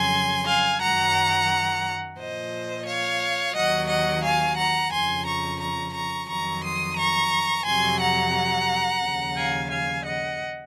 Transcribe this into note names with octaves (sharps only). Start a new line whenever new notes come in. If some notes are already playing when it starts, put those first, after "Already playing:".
Already playing: F2 C#3 F#3 G#5 C6
F5 G#5
F#2 D#3 F#3 F#5 A#5
A#2 F3 C5 D#5
C#5 F5
D#2 D#3 F#3 D#5 F#5
D#5 F#5
F5 G#5
F#5 A#5
F2 C#3 F3 G#5 C6
A#5 C#6
A#5 C#6
A#5 C#6
F2 D#3 F#3 A#5 C#6
C6 D#6
A#5 C#6
F2 C3 F#3 G#5 C6
F#5 A#5
D#2 C#3 F3
F5 G#5
F5 G#5
D#5 F#5